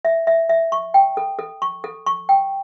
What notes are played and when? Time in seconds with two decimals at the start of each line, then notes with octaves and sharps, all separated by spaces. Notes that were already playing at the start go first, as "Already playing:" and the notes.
0.05 E5
0.27 E5
0.49 E5
0.72 C#6
0.94 G5
1.17 A4
1.39 A4
1.62 C#6
1.84 A4
2.07 C#6
2.29 G5